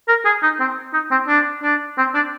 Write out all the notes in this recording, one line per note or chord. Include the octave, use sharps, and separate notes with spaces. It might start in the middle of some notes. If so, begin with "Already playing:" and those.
A#4
G#4
D#4
C4
D#4
C4
D4
D4
C4
D4